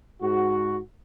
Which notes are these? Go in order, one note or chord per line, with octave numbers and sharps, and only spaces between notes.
G#2 F#4